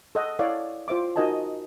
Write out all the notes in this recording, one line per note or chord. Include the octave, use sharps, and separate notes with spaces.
A4 D#5 F#5
E4 A4 C#5 D5 F5 F#5
F4 C5 E5 D6
D#4 F#4 A#4 D#5 G#5 A5